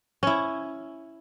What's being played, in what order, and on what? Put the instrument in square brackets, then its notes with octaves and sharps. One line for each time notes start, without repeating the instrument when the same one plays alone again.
[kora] C#4 E4